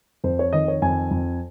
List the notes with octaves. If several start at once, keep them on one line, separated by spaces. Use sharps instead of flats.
F2 C5
C#5
D#3 D#5
C#5
F2 G#5
F2